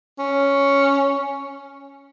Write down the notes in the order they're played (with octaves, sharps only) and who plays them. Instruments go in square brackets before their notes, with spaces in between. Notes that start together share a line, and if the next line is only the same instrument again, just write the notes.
[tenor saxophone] C#4